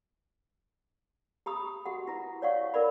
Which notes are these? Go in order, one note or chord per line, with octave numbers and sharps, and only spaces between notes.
G4 A#5 B5 D#6
F#4 G4 F#5
E4 A#5
C#5 D5 F5 F#5 C#6
E4 A#4 D5 B5